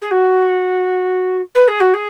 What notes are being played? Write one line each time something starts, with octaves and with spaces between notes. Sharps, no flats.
G#4
F#4
B4
G#4
F#4
G#4